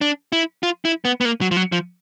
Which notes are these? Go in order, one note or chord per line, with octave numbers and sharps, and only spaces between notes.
D4
E4
F4
E4
B3
B3
A#3
F#3
F3
F#3
F3